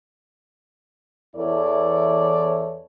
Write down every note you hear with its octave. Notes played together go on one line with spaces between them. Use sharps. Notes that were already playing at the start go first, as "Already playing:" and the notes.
E2 E3 E4 A4 C#5 D5